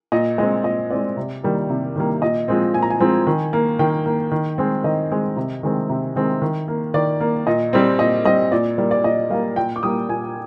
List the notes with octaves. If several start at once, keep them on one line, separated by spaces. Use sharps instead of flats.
A#2 D#5
G#3 C4 D#5
A#2 D#5
G#3 C4 D5
C3
D#3 G3 A#3
C3
D#3 G3 A#3
A#2 D#5
F3 G#3 C4
A#2 G#5
A#5
G#5
F3 G#3 C4
D#3
A#3
D#3 G5
A#3
D#3
G#3 C4
D#3 D#5
G#3 C4
C3
D#3 G#3 C4
C3
D#3 G#3 C4
D#3
A#3
D#3 D5
A#3
A#2 D#5
G3 C4
A#2 D#5
G3 C4 D#5
A#2 D5
G3 A#3 D5
D5
A#2 D#5
G3 A#3 F5
A#2 G5
D6
G3 A#3 D#6
A#2 G#5